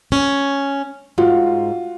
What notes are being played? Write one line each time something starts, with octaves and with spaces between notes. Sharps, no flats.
C#4
G#2 F4 F#4